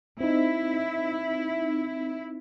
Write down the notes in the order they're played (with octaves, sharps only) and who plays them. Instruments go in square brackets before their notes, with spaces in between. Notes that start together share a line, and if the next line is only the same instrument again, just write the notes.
[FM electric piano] C4 D#4 [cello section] E4